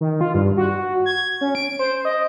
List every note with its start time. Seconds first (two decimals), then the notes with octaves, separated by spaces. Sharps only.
0.01 D#3
0.21 F4
0.34 G2
0.57 F#4
1.06 G#6
1.41 C#4
1.55 D7
1.79 C5
2.05 D#5